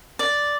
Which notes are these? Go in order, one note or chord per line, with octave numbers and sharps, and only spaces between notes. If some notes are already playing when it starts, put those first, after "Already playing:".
D5